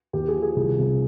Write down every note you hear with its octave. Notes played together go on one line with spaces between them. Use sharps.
D#2 G4
G#4
F3
G#4
C2
C3